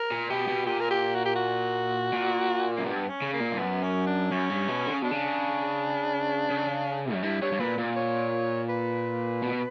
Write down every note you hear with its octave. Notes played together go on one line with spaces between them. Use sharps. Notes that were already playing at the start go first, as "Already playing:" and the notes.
Already playing: A#4
A#2
B2 G4
B2
A#2 G4
A#4
G4
F#4
G4
F#4
A#2
F#2 A#3
G2 B3
C#4
C#3
A#3
A#2
G2
F#2 B3
C#4
D4
F#2 C#4
G2
B2
D3
C#3
B2 D4
C#3
C#3
F#2
G2 E4
G2 C#5
G2
A#2 B4
A#2
C#5
B4
B2